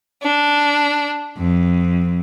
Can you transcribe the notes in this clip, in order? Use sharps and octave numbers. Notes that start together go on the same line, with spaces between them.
D4
F2